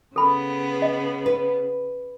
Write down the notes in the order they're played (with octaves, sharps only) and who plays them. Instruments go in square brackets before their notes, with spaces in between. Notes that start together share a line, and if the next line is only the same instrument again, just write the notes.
[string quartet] C#3 B3 [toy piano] A4 B5
[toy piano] D#5
[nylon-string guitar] B4